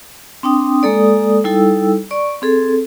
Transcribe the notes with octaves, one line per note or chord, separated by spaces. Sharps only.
C4 D4 G5 D#6
G#3 A#3 A4 D5 D#6
G3 D#4 E4 A4 G5 E6
D5 C#6
C4 G#4 A4